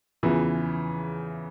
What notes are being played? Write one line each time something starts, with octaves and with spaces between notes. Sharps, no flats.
E2 C#3 E3 F3